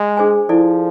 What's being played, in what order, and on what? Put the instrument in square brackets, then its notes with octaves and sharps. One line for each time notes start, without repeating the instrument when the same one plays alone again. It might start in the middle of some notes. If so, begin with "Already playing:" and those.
Already playing: [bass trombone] G#3
[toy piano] D4 G#4 C5 G#5
[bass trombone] F3 [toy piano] E4 A4 D5